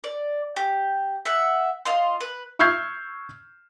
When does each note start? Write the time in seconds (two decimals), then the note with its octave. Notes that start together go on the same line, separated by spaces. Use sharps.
0.04 D5
0.56 G4
1.25 E5 F#5
1.85 F4 D#5 C6
2.21 B4
2.59 C#6 E6 F6 G6 G#6 C7